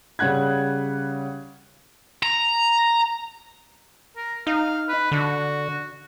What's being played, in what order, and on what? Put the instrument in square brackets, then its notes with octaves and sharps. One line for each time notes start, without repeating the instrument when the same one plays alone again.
[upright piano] C#3 G3 F#5 F#6 G#6
[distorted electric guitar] A#5
[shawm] A#4
[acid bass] D#4 [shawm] F5
[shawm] B4
[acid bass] D3 [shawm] F#4